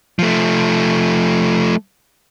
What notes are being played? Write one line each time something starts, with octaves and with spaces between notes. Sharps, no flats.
F3 A3